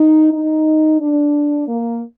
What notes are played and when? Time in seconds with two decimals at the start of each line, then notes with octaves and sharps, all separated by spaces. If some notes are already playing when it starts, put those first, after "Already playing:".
Already playing: D#4
0.32 D#4
1.00 D4
1.67 A#3